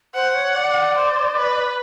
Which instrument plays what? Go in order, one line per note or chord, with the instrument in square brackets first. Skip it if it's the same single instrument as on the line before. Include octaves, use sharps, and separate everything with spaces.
[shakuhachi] C5 [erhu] F#5
[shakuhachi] C#5
D5
[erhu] C5
B4